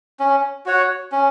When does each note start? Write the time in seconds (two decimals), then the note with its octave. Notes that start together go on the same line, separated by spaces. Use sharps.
0.19 C#4
0.66 F#4 C#5 F#5
1.12 C#4